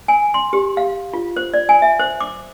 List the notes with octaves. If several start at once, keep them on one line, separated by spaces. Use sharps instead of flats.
G#5
C6
G4
F5
F4
C5
D5
G#5
E5
C5
D6